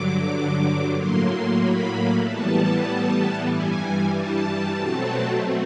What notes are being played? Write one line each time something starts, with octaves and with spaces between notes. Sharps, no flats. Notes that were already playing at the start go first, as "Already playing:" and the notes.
Already playing: G2 D3 F#3 D6
A2 F#3 A#3 C6
C6
B5
A2 E3 G3 B3 A5
G2 E3 G3 G#5
A5
B2 F#3 A3 C4